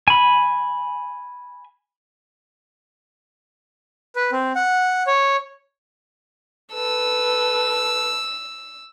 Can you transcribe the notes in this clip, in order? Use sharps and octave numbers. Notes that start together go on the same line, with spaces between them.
G#5 B5
B4
C4
F#5
C#5
A4 B4 E6